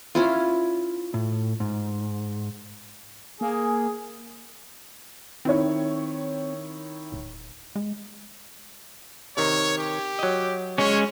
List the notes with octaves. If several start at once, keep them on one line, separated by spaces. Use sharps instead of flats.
C#4 E4 F4
A2
G#2
A#3 G#4
D#3 C4 E4 C#5
D1
G#3
C3 D#3 C#5
G4
F#3 D#5
G#3 C#4 C#5